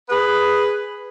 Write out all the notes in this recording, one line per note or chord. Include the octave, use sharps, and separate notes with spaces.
G#4 B4